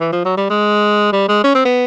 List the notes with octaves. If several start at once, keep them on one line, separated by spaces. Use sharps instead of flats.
E3
F3
F#3
G3
G#3
G3
G#3
C#4
C4
B3